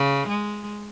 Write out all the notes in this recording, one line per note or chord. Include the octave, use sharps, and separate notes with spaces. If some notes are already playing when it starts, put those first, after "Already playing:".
Already playing: C#3
G#3